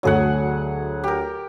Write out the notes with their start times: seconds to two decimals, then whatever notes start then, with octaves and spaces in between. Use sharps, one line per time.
0.03 D2 F#3 A3 G#4 C#5 F#5
1.04 G4 A#4